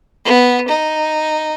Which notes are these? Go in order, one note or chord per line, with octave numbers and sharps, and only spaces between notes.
B3
D#4